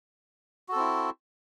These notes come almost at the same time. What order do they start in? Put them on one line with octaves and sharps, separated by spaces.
F#4 A4 C4 E4